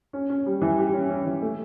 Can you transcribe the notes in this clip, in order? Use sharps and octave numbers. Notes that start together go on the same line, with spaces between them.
C#4
C#4
G3
E3
G4
C#4
C#4
E3
A3